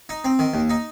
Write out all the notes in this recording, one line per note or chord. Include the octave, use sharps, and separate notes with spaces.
D#4
C4
D#3
D#2
D#4